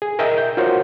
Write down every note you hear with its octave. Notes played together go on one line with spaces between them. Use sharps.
G#4
A#4 D#5 E5 G5
G6
F4 F#4 A#4 C5 C#5